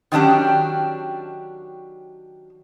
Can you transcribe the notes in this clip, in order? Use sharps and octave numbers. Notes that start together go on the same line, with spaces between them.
D#3 F#3 C#4 D4 G4